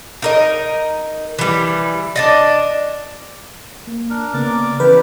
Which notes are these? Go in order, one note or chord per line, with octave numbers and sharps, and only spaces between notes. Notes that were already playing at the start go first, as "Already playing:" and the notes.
D#4 A#4 D#5
E3 G3
D4 D5 D#5
A#3
D4 A#4
C#3 A#3 B3 A#4 D5 D6
E3 C#4 E4 G4 B4 D6